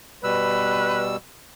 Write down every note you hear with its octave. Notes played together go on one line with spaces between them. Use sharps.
B2 G3 B4 E6